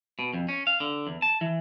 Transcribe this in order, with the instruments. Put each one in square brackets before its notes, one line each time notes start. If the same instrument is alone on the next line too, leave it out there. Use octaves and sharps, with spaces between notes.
[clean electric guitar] B2
F2
C#4
F5
D3
E2
A5
E3